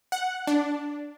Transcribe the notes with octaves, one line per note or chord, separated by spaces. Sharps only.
F#5
D4